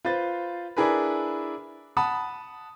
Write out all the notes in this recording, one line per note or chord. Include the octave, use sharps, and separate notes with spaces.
F4 B4 C5 A6
D4 E4 G#4 A#4 B4
F#5 A5 B5 D#6